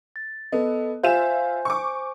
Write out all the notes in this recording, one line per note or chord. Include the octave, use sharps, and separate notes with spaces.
A6
B3 A4 D#5
F4 C5 E5 G#5 E7
C#6 D6